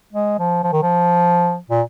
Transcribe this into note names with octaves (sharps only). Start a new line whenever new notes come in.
G#3
F3
F3
D#3
F3
A#2